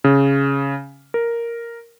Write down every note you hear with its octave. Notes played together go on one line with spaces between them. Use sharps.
C#3
A#4